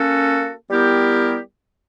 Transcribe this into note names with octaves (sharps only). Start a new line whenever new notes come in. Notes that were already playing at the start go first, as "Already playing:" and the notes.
Already playing: A#3 C#4 F#4 A4
G3 B3 E4 G4 A#4